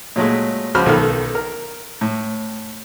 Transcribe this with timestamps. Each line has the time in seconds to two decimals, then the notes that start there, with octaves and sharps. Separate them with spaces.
0.16 A#2 F#3 G#3 A3
0.75 C#2 F3 F#4 C5 B5 F6
0.86 B1 D#3 A4 F6
1.35 A#4
2.01 A2